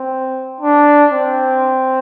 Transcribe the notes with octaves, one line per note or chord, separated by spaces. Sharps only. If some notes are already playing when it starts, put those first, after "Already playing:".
Already playing: C4
D4
C4